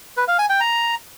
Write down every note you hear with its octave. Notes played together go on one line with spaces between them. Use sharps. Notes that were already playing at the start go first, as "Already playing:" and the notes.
B4
F5
G#5
G5
A#5